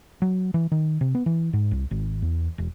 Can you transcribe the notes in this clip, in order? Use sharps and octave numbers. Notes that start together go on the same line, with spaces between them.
F#3
E3
D#3
C3
B3
E3
G#2
C2
G#1
E2
E1